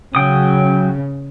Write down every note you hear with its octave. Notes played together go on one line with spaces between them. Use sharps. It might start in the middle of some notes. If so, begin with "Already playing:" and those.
C#3 F#3 G5 D#6